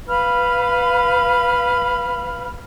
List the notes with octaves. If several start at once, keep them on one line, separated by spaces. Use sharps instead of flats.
B4 F5 B5 F6